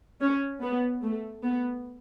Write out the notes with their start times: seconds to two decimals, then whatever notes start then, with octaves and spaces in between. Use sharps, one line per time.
0.21 C#4
0.62 B3
1.02 A3
1.43 B3